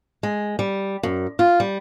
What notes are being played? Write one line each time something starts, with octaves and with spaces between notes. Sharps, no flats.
G#3
G3
F#2
F4
G3